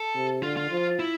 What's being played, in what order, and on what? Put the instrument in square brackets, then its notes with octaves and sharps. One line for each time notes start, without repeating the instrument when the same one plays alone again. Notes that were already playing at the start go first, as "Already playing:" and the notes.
Already playing: [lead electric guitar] A4
[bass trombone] C3
[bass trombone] D3 [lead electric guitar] F4
[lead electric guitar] F4
[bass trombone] F3
[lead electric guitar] E4